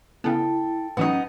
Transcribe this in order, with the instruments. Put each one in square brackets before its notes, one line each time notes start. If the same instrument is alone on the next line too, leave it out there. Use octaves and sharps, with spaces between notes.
[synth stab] C#3 B3 [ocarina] E4 [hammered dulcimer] A4 G5
[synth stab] A2 E3 F#3 [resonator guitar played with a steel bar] B3 D#4 [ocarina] C#4